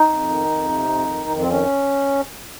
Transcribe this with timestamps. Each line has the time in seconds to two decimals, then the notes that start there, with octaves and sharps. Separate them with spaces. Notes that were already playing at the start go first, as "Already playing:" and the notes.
Already playing: D#4
0.09 F2
0.29 D#3
0.49 F2
0.69 C3
0.89 F2
1.08 D#3
1.29 F2
1.41 C4
1.49 D#3 C#4